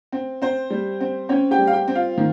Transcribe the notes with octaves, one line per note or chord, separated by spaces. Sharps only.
C4
C4 C5
G3
C4
C4 C#4 C#5
G4 G5
G3
F5
G4 G5
C4
F4 F5
D#3